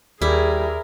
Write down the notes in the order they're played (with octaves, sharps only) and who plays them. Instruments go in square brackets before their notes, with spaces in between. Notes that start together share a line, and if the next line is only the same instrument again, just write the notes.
[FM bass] D#2 [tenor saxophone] G3 [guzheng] E4 [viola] G#4 A#4